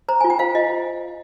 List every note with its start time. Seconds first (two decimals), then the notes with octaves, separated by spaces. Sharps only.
0.09 C5 A#5
0.20 F4 G#5
0.30 G5
0.39 C5 F5
0.55 F4 D#5